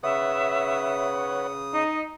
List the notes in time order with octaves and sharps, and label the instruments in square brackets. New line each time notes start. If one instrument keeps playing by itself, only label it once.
[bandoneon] C#3 D#6 [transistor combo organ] B4 C#5 F#5 [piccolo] E5
[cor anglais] D#4 [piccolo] D#5